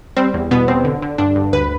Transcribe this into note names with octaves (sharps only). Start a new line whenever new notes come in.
G3 C4
E2
B2 B3
B2 C4
D3
D3
G2 D4
G2
D2 B4